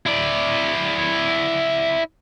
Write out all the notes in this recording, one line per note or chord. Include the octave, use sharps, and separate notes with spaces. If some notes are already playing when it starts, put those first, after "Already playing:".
E4 D5